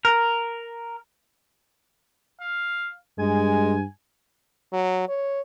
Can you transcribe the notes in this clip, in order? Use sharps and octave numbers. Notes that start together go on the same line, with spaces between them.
A#4
F5
G2 G#3 G#5
F#3
C#5